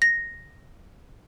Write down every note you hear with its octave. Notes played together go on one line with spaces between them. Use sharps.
A#6